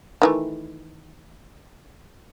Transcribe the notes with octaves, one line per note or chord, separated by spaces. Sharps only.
D#3 E3 A3